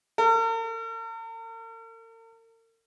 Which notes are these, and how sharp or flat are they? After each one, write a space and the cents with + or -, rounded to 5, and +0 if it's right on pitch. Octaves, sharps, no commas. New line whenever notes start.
A#4 -45